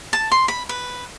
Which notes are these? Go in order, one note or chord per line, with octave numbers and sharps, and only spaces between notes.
A5
C6
B5
B4